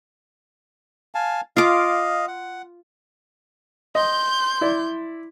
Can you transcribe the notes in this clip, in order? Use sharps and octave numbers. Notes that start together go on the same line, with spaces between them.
F5 G#5 A5
F4 D#5 F5 D6
F#5
D#5 C6 G6
E4 D5